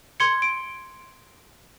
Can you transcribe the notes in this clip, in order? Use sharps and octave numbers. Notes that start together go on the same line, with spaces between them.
C6 G#6 C#7
D7